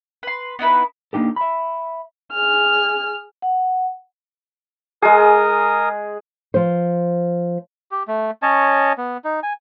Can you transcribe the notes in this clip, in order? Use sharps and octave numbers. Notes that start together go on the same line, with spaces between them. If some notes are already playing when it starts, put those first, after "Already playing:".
B4 C6
B3 D#4 E4 B4
A#3 D4 D#4 G4 A4
E5 B5
G#4 F6
F#5
G#3 G#4 A#4 D#6
F3 C5
G4
A3
C#4 C#5 D#5 A5
B3
D#4
G#5